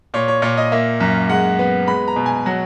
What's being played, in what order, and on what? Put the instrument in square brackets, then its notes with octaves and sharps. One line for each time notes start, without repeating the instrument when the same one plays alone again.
[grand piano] A#2 C#5
C#5
A#2 C#5
D#5
A#3 E5
F#2
G#3 F#5
B3
G#3 B5
A#5
B2
G#5
F#3 F#5